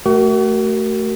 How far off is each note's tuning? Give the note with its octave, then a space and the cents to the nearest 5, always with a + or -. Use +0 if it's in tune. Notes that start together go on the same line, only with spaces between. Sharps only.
A3 +0 F#4 +40 A#4 +0